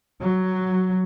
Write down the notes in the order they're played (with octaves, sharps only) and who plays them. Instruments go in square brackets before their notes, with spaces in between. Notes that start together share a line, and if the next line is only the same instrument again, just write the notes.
[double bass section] F#3